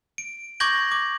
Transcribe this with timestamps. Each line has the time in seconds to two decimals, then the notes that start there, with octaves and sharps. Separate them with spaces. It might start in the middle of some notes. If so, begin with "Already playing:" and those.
0.18 D7
0.60 C#6 D6 G6 G#6 A#6 F#7
0.92 D6